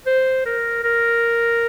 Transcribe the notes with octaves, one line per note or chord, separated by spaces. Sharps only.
C5
A#4
A#4